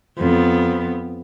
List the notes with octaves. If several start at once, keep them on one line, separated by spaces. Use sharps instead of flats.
F2 B3